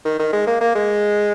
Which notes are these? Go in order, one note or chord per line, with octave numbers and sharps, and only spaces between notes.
D#3
D#3
G#3
A#3
A#3
G#3